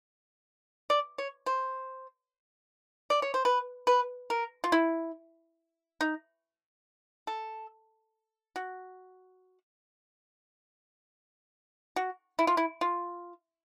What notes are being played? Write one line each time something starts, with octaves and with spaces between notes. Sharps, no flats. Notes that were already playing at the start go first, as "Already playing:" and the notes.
D5
C#5
C5
D5
C#5
C5
B4
B4
A#4
F4
E4
D#4
A4
F#4
F#4
E4
F4
E4
F4